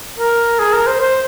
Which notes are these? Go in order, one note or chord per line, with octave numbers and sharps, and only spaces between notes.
A#4
G#4
A#4
C5
C5